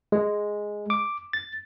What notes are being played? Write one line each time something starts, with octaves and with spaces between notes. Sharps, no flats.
G#3
D6
A6